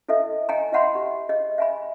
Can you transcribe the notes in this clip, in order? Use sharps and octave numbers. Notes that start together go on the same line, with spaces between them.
E4 A4 D#5 E5
D#5 G5 G#5 A#5
E4 D#5 E5 F#5 B5 C6
G4 G#5
G#4 D#5
E5 G#5 B5